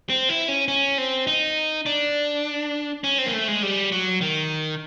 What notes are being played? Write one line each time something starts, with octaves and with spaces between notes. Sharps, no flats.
C4
E4
C#4
C#4
C4
D#4
D4
C#4
C4
A#3
A3
G#3
G3
F#3
D#3